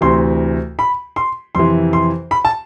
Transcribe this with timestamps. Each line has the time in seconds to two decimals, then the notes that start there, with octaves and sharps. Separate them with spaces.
0.01 D2 C3 E3 C6
0.79 B5
1.16 C6
1.55 F2 C3 E3 C6
1.93 C6
2.31 B5
2.45 A5